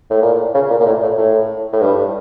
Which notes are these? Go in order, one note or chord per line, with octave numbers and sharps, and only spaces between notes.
A2
A#2
C#3
A#2
A#2
A2
A2
A2
A2
G2